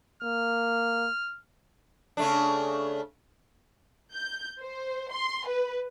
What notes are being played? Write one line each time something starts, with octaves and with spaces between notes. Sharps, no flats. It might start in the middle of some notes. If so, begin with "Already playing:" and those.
A#3 F6
C#3 A3 D4
G6
C5
C6
B4